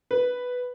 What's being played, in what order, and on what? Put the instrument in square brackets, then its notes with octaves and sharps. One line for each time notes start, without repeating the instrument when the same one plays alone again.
[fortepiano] B4